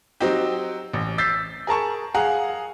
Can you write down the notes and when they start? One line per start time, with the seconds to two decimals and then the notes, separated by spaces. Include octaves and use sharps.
0.20 F#3 C4 D#4 G4
0.93 A1
1.18 E6 G6 A6 B6 C7
1.67 G#4 A#4 A5 C#6
2.15 G#4 F5 F#5 A#5